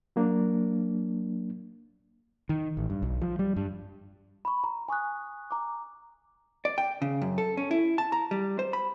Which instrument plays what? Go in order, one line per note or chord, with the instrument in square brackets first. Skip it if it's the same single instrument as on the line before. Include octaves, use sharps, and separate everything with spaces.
[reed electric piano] F#3 A#3 D4
[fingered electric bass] D#3
A1
G2
B1
F3
G3
G2
[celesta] B5 C#6
A#5
G#5 C#6 D#6 F#6
A#5 D6
[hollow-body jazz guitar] D5
G5
C#3
F#2
A4
C#4
E4
A5
A#5
G3
C5
B5